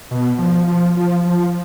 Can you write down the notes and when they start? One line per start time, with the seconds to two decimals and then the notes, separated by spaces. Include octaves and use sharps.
0.11 B2
0.38 F3
0.67 F3
0.97 F3
1.25 F3